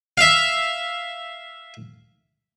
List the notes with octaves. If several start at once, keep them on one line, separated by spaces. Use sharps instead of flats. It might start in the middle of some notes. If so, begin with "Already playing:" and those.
E5 F5